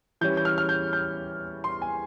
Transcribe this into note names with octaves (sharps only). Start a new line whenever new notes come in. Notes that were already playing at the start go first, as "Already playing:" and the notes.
E3 G3 C#4 G6
G6
F6
F6
G6
G6
C6
G#5